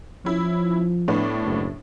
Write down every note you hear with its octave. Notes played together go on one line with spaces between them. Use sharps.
F3 C#4 E4
A2 B3 D4
F#1